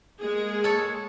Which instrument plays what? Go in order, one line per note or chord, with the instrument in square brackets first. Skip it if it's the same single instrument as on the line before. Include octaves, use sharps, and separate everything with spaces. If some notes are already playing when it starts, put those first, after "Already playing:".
[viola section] G#3 A#3 G#4
[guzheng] A4 C#5